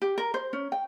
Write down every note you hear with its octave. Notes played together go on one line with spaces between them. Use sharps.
G4
A#4
C5
C#4
G5